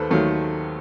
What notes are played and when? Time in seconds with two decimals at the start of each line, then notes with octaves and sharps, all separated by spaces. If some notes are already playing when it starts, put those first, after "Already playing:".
Already playing: D#2 D#3 A4 B4 C5
0.10 D#2 D#3 F#3 A3 A4